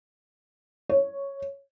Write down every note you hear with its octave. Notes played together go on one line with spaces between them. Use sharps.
C#5